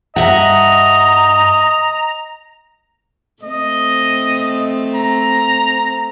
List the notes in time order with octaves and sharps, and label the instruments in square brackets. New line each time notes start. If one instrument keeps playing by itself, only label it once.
[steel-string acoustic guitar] G2 E5 F#5 [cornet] D#5 [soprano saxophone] A#5
[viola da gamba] A3 C4 [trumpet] D#5
[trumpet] A#5